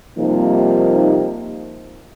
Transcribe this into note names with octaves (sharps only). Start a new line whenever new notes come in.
C3 F3 G3 A#3 D#4